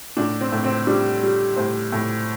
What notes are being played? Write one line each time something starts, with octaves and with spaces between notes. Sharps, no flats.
A2 D4
C4
A2
C4
G3 D4
G3
A2 C5
A2